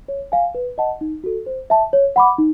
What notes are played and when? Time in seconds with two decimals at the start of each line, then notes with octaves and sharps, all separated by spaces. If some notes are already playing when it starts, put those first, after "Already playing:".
0.08 C#5
0.32 F5 G#5
0.55 B4
0.78 D#5 F#5 A5
1.01 D#4
1.24 F#4 A4
1.46 C5
1.70 E5 A5
1.93 C#5
2.16 F#5 B5 D6
2.38 D#4